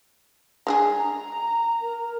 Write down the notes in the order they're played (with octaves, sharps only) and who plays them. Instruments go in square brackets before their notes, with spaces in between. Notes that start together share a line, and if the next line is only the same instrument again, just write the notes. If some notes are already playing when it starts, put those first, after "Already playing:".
[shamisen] G#3 D4 G#4
[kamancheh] A#5
[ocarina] A#4